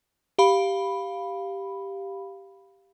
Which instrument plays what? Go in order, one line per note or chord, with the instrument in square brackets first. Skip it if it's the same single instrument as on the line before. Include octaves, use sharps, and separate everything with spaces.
[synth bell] G4 F5 B5